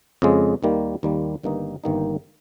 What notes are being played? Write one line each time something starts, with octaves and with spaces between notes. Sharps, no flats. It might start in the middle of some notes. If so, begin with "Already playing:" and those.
F2 C#3 G#3
D#2 D#3 G3 A#3
D#2 D#3 G3 A#3
G1 G2 D#3 A#3 D#4
G1 G2 D#3 A#3 D#4